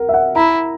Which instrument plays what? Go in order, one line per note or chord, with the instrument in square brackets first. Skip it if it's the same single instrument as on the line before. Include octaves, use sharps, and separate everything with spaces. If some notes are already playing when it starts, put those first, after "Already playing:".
Already playing: [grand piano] A#4 F#5
E5
F#5
[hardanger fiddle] E4 [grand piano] A#5